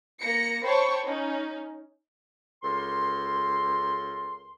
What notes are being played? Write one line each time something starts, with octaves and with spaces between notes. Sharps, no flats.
A#3 A#6 C#7
C5 C#5 G5 A5 B5 C#6
C#4 D#4
C#2 A4 A#4 C6